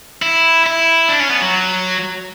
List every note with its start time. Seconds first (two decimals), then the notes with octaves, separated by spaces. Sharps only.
0.22 E4
0.66 E4
1.09 D4
1.20 C#4
1.30 B3
1.41 F#3